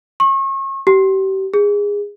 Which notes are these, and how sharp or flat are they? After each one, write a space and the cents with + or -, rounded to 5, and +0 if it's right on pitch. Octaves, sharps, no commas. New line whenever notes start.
C#6 -35
G4 -35
G#4 -20